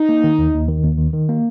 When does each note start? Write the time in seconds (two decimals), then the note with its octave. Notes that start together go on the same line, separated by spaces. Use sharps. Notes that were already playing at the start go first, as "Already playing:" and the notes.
Already playing: D#4
0.09 A#3
0.24 D#3
0.39 D#2
0.54 D#2
0.69 D#3
0.84 D#2
0.98 D#3
1.13 D#3
1.29 A#3